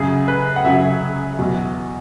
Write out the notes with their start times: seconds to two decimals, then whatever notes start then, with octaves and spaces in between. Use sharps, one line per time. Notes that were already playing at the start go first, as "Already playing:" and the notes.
Already playing: F#2 C#3 F#3 G#4
0.28 B4
0.56 F#5
0.65 F#2 C#3 F#3 E5
1.39 E2 B2 F#3